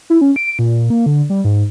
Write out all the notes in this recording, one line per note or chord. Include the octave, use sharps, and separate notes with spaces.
E4
C#4
D7
A#2
A#3
D3
G3
G#2